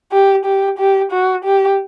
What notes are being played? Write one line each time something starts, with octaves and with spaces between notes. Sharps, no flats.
G4
G4
G4
F#4
G4